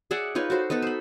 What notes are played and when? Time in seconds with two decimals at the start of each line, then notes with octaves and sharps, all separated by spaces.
0.11 G#4 D5 E5 F#5
0.35 D#4 F4 B4 C#5
0.50 F#4 A4 C5
0.70 B3 D#4 A4 B4
0.82 C5 B5